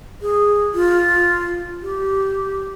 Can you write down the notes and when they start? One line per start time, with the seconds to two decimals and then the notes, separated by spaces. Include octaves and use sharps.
0.22 G#4
0.75 F4
1.83 G4